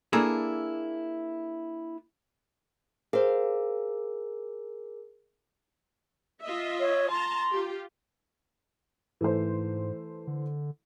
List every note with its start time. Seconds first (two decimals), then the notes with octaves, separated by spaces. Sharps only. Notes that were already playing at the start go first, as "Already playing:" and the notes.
0.13 A#3 D4 E4 G#4 A4
3.13 G#4 A#4 C5 F5
6.43 F4 D#5 E5
6.80 C#5
7.10 A5 A#5 C6
7.50 F4 G4
9.21 G#2 E3 A3 C5
10.27 D3